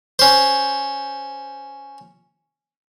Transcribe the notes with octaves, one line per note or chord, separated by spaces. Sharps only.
C#4 C5